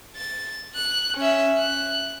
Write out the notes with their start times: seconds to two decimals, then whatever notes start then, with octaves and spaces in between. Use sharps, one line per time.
0.17 A6
0.75 F#6
1.17 C#4 E5
1.58 F#6